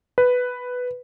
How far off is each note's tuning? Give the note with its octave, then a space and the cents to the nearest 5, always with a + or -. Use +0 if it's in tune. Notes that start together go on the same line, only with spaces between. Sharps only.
B4 +5